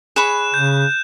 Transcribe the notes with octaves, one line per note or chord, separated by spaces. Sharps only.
G#4 C#5 B5 F#6 E7
C#3 G6